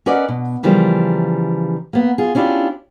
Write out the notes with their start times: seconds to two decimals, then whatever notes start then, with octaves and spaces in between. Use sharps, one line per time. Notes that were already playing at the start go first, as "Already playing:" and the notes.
0.06 C#4 A#4 B4 D5 D#5 F#5
0.29 B2
0.63 C#3 E3 F3 G3 A#4
1.93 A#3 B3
2.18 F4 G#4
2.35 C#4 D4 E4 F4 G4